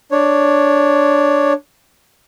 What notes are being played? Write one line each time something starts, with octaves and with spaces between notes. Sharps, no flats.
D4 C#5